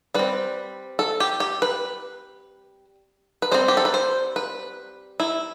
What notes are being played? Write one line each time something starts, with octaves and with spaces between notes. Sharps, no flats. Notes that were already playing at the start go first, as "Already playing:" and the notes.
G3 C4 B4
A4
G4
G4
B4
B4
G3 C4 C5
G4
A4
B4
C5
B4
E4